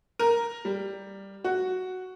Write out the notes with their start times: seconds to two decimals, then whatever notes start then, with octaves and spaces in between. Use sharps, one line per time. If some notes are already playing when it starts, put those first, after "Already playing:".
0.19 A#4
0.65 G3
1.44 F#4